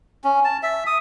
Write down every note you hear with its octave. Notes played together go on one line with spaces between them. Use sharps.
C#4
A5
E5
D#6